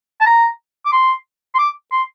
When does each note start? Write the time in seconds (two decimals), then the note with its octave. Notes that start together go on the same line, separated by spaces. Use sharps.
0.21 A5
0.26 A#5
0.86 D6
0.93 C6
1.55 C6
1.59 D6
1.92 C6